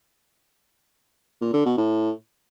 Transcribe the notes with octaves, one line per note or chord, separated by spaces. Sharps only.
A#2
D3
B2
A2